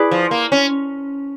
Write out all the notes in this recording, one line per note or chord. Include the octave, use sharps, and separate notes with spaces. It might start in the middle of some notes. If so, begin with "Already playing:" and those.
Already playing: E4 G#4 B4 D5
F3
A#3
C#4